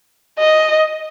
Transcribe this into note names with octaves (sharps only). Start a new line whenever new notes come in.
D#5